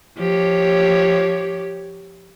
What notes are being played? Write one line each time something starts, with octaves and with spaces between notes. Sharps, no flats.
F3 G4 C#5